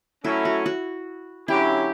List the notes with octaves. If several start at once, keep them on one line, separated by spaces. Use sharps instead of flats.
F#3 A3 C#4 E4
F#4
F#4
D3 F#3 C#4 E4 G4